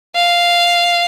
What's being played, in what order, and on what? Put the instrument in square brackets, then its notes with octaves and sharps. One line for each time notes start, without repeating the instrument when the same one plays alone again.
[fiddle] F5